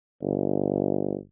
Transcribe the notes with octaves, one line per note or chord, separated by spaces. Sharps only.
G1